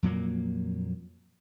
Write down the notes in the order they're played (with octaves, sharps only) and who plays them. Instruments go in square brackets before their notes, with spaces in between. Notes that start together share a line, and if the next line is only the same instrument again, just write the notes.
[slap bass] F2 A#2 F#3 A#3